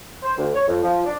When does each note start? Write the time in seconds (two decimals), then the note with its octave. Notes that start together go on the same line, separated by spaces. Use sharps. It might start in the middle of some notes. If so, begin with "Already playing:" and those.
0.23 C5
0.37 D2
0.54 C#5
0.66 F2
0.82 F3
1.05 D4